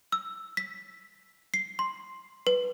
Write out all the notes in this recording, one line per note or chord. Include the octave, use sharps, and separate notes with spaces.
E6
B6
C7
C6
B4